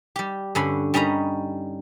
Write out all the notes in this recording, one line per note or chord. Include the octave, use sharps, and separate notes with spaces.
G3 G4
G2 D3 C#4 B5
G3 C#4 D#4 A#5 B5